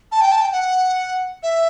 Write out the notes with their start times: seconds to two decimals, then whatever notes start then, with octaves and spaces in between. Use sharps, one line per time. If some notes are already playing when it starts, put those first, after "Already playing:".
0.12 A5
0.21 G5
0.32 A5
0.41 G5
0.52 F#5
1.43 E5